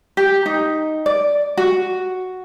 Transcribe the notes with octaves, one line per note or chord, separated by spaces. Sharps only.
G4
D#4
D5
F#4